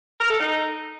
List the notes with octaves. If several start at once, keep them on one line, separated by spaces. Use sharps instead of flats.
A#4
A4
D#4